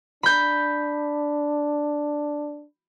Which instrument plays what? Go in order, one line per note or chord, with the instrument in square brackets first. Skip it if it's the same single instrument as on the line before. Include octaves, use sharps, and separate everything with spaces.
[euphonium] D4 [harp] B5 G6